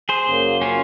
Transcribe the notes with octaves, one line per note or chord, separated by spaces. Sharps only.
G#4 C5
F#2 C#3 F#3 A#3
C#4 F4